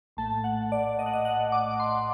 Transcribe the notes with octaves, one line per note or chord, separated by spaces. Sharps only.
A#1 A2 A3 A5
F#5
D5
D#5
F#5
D#5
F#5
D6
D6
C6